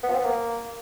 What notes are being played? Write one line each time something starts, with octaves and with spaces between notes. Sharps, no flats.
B3
F3
C4
B3
A#3